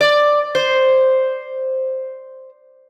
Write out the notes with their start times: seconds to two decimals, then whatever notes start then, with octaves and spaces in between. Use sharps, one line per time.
0.01 D5
0.55 C5